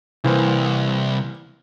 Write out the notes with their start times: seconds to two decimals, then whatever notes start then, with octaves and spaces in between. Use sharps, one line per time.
0.24 C2 E3 A#3 C4